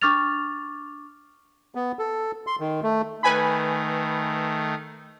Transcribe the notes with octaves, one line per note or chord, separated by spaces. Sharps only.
D4 C#6 D6 F6 A6 F7
B3
A4
C6
D#3
A3
D#3 A3 B4 G#5 B5